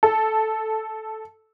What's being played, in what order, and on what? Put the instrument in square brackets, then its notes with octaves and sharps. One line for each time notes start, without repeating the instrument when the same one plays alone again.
[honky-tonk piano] A4